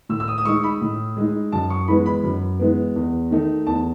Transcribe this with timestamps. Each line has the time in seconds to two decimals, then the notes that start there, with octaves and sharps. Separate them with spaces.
0.09 A2 E6
0.20 E6
0.28 D#6
0.38 D#6
0.45 G#3 D#4 C#6
0.64 B5
0.81 A2
1.17 G#3 D#4
1.52 F#2 A5
1.70 C#6
1.88 E3 G#3 B3 B5
2.06 B5
2.24 F#2
2.60 E3 G#3 B3
2.96 E2
3.31 D#3 A3 D#4
3.67 E2 A5